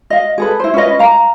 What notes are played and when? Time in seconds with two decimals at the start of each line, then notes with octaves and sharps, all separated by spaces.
0.10 D#5 F5
0.38 G#4 A4 B4
0.60 E4 C5
0.74 C#4 F4 B4 D#5
0.99 F5 A#5